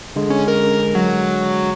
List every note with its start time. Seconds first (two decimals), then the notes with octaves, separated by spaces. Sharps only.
0.16 D3 G#3
0.30 C#4
0.48 A#4
0.95 F#3